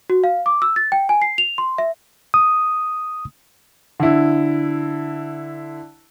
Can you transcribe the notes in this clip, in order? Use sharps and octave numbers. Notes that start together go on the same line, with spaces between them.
F#4
F5
D6
E6
A6
G5
G#5
C7
F7
C6
E5
D#6
D3 E4